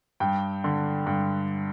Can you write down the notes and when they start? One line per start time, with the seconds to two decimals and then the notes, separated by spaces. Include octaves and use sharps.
0.20 G2 G5
0.64 D3
1.07 G2